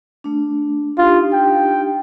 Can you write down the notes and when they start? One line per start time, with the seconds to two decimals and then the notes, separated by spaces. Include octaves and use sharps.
0.24 A3 D4
0.98 D4 D#4 F4 G4
1.33 G5